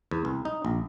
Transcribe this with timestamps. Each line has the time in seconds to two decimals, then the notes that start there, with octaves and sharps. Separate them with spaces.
0.11 E2
0.25 C2
0.45 D#4
0.65 A#1